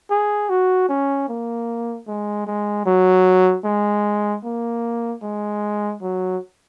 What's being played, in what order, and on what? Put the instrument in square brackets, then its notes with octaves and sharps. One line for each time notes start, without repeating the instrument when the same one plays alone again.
[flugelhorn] G#4
F#4
C#4
A#3
G#3
G#3
F#3
G#3
A#3
G#3
F#3